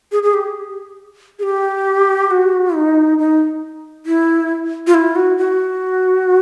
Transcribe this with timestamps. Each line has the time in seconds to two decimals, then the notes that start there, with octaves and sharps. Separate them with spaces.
0.12 G#4
0.23 G#4
0.34 G4
1.39 G#4
1.43 G4
2.31 F#4
2.75 D#4
3.19 D#4
4.06 E4
4.87 F4
4.94 E4
5.16 F#4
5.38 F#4